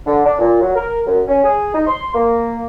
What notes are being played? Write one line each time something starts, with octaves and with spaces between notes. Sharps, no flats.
D3
D4
A#2
F#3
A#4
F#2
C#4
G#4
D#4
C6
A#3